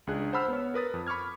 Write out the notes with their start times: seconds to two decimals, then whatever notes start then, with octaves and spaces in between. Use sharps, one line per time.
0.07 C#2 D4 G#4 F#6
0.33 C5 F#5 A5 B5 E6 F6
0.48 B3 C#5
0.74 A#4 B4 D#6 A6
0.94 F2
1.07 B5 C#6 D6 F6 G#6